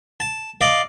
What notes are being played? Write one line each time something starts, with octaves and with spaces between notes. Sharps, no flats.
A5
D5 D#5 F5